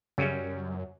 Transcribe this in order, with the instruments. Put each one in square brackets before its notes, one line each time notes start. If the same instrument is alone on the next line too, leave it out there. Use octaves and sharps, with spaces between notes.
[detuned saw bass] F#2 [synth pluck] C#3 [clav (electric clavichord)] F#3 G3 C#4